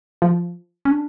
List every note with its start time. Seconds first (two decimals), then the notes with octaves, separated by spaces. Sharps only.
0.22 F3
0.85 C#4
0.91 D4